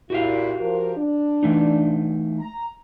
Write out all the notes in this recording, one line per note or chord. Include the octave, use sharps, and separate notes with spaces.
A#2 E4 F#4 G4 F5
F3 A#4
D4
E3 A3 D#4
A#5